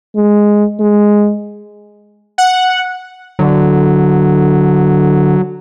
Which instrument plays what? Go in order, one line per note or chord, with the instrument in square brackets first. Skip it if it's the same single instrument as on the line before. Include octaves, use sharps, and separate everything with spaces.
[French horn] G#3
G#3
[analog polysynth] F#5
[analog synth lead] D3 [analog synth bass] F#3